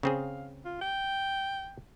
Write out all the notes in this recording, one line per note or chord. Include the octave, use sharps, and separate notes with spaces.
C#3 C4 G#4 F5
F4
G5